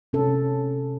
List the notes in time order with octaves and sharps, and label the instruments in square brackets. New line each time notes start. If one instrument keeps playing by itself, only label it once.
[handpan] C3 C#4 A4